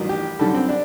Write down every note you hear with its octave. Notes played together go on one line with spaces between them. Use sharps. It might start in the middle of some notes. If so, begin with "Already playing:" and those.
Already playing: A1 G2 D#3 F#3
G4
F#2 D3 G3 A4
C4
D4